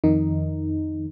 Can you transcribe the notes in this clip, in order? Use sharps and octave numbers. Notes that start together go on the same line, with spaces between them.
F2 D#3 D#4